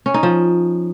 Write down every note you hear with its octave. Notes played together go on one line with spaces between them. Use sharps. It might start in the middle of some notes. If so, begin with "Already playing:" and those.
C#4
D#4
F3